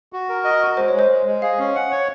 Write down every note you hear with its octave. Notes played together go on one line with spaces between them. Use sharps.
F#4
A#4
D#5
F#4
G#3 C5
C#5
G#3
C5
G#3
G#3
G#4 F5
C#4
F#5
C#5